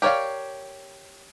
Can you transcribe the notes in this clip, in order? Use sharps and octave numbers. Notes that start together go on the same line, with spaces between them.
G4 A#4 C#5 D5 F5